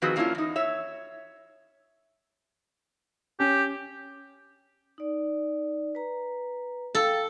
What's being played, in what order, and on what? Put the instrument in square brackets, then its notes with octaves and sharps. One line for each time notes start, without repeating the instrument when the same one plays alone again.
[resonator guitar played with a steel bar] D#3 F3 C4 F#4 G#4 B4
F#3 A#3 C#4 D4 E4 F4
E2 D#4
C#5 E5
[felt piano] C#4 [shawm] G4
[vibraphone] D#4 D5
B4 A#5
[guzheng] A4 [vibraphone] F5 G5